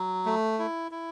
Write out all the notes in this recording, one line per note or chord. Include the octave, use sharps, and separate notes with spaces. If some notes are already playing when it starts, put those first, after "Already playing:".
Already playing: F#3
A3
E4
E4